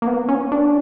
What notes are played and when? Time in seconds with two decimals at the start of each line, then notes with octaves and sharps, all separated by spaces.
0.02 A#3
0.07 B3
0.29 C#4
0.52 D4